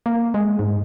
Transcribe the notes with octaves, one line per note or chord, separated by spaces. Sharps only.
A#3
G#3
G#2